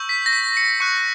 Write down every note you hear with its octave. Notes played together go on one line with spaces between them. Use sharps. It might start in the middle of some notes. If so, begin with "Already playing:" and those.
Already playing: C#6 E6 G6
B6
A#6
B6
C#7
C#6 F#6 C#7